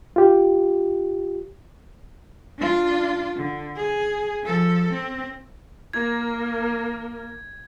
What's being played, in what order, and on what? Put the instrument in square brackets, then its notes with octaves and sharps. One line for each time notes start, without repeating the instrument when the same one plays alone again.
[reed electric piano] F4 G4
[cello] D4 F4
D3
G#4
F3 A4
C4
[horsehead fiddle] A#3 A#4 [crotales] G#6